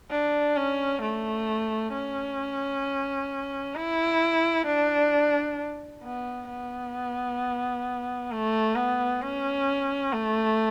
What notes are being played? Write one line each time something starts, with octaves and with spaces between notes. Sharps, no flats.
D4
C#4
A3
C#4
E4
D4
B3
B3
A3
B3
C#4
A3